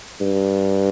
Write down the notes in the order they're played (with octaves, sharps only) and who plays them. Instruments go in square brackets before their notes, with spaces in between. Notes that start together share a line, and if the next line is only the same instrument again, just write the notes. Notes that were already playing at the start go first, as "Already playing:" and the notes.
[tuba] G2